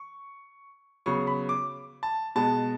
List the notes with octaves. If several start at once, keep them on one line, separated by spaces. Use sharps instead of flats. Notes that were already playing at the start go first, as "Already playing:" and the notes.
Already playing: C#6
C#3 F#3 B3 C#6
B5
D6
A5
B2 G#3 B3 A5